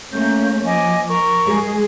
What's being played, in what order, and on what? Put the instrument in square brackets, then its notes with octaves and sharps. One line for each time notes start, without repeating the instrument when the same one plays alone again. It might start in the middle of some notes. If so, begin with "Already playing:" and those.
[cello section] A3 A#3 C#4 [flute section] G6
[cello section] F3 [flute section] D#5 G#5 D6
[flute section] A#4 C#6
[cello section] G#3 G#4